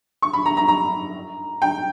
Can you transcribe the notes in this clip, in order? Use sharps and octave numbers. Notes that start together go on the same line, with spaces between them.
C#6
B5
A#5
A#5
A#5
G5